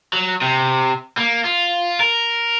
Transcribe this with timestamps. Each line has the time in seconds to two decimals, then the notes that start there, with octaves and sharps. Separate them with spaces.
0.13 F#3
0.41 C3
1.17 A#3
1.44 F4
2.00 A#4